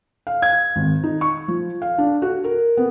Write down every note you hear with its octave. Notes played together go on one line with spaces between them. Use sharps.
F5
G#6
G#1
D#4
C#6
F3
F5
D4
F#4
A#4
B3